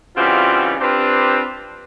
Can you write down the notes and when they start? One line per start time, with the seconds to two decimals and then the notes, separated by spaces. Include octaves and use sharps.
0.17 C#3 E3 G3 C4 F4 F#4
0.80 C4 D4 F4 G4 B4 C5